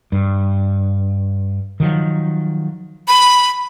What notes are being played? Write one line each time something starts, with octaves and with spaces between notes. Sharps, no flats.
G2
D#3 F3 F#3
B5